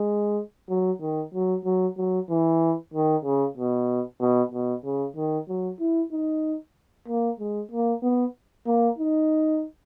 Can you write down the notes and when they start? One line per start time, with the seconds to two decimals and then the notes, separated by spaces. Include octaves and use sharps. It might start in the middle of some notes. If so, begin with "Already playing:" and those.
Already playing: G#3
0.69 F#3
1.01 D#3
1.34 F#3
1.65 F#3
1.97 F#3
2.30 E3
2.94 D#3
3.25 C#3
3.57 B2
4.20 B2
4.52 B2
4.85 C#3
5.16 D#3
5.49 F#3
5.80 E4
6.12 D#4
7.08 A#3
7.40 G#3
7.71 A#3
8.03 B3
8.67 A#3
8.98 D#4